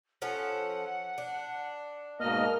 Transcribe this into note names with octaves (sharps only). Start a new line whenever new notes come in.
F3 C#4 A4 F#5
D4
G#2 B2 A#3 D#5 F6